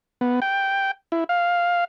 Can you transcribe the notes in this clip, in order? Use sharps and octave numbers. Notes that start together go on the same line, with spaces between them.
B3
G5
E4
F5